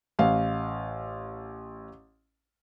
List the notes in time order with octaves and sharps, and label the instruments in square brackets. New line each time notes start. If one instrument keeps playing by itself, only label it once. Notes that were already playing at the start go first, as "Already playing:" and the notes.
[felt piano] A1 F5